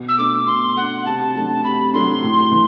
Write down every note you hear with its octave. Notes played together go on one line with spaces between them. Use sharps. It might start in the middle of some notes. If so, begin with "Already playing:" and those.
Already playing: B2
E6
A3 D4 D6
B2 C6
A3 D4 F#5
C3 A5
F#3 A3 D4 A5
C3 B5
F#3 A3 D4 C6
A2
E3